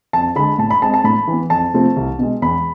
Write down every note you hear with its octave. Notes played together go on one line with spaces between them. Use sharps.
F2 A5
D3 G#3 B5
A2 A5
B5
G#3 C4 A5
A5
A2 B5
E3 B3
F2 A5
C3 F3 A3 C4
C2
B2 G#3
E2 B5